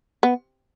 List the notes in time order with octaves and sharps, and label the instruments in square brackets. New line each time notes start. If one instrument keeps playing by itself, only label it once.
[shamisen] B3